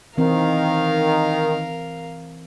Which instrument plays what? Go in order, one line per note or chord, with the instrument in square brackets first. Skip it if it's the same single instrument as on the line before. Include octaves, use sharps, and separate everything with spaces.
[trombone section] D#3 [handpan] E3 C4 [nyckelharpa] A#4 F5